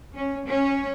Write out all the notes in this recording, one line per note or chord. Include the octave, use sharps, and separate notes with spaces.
C#4
C#4